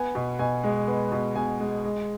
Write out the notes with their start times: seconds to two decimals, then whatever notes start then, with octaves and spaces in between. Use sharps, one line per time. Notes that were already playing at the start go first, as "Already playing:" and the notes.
Already playing: B3 G#5
0.15 B2
0.39 B2 G#5
0.64 G#3
0.88 B3
1.12 B2
1.35 B2 G#5
1.60 G#3
1.84 G#3